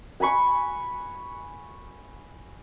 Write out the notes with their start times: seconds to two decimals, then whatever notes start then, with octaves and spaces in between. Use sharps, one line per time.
0.20 F#5 G#5 B5 C#6